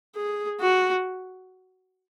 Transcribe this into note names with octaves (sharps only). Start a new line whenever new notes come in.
G#4
F#4